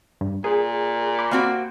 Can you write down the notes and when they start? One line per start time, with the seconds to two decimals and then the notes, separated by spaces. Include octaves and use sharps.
0.21 G2
0.44 A#2 G#4 A#4
1.19 B5 D6
1.31 A#3 C4 F#4